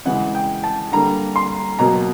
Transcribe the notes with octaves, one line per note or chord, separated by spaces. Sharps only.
C#3 E3 G#3 F#5
G5
A5
D3 G3 A#3 A#5
C6
B2 F#3 A#3 A#5